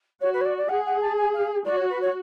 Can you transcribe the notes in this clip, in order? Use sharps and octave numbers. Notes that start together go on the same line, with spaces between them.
F#4 C#5
B4
C#5
D5
D5
G#4 F#5
F#5
A5
G#5
F5
F#4 D5
C#5
B4
C#5